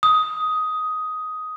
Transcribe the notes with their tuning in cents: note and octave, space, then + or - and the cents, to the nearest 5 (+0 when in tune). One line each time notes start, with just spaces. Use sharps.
D#6 +10